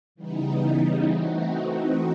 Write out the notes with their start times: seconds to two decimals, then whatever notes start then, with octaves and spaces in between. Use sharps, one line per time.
0.15 C#3 E3 G3 B3 D#4
1.10 E3 A3 C4 D#4 F#4